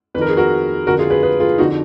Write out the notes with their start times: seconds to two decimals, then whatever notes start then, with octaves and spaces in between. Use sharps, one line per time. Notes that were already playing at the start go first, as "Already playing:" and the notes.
0.14 F2 B4
0.18 D#3 A#4
0.29 G#4
0.37 F#4 A#4
0.87 F2 D3 F#4 A#4
0.99 F4 G#4
1.10 G#4 B4
1.23 G#4 B4
1.40 F4 G#4
1.58 F2 D3 D#4 F#4